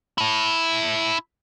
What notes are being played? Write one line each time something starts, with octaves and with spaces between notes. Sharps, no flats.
E4 A5